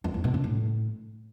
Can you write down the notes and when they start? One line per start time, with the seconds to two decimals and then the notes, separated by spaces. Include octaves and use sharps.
0.04 F2
0.14 E2
0.24 B2
0.34 C#3
0.44 A2